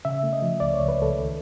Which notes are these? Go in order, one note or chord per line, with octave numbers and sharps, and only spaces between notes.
C#3 E5
A3
D#5
F3
C#2 D5
C#5
C#2
B4
C#2 A4
D#3